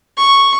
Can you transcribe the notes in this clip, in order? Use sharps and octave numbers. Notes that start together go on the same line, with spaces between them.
C#6